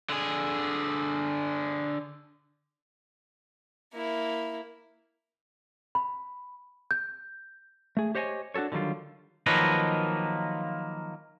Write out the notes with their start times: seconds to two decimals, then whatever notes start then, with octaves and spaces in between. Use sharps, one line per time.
0.10 D3 G#4
3.93 A#3 E4
5.95 B5
6.91 G6
7.97 A3 G#4
8.15 G4 C5 C#5 D#5 F#5 G#5
8.54 D4 F#4 G#4 A4 C#5
8.72 D3 D#3 F#3 G3 F4
9.46 D#3 F3 F#3 A#3 B4 D#5